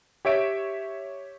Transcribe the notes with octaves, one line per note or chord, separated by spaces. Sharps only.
G4 C#5 E5 D7